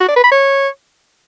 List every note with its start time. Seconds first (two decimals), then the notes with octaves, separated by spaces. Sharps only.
0.01 F#4
0.08 D5
0.16 B4
0.24 B5
0.32 C#5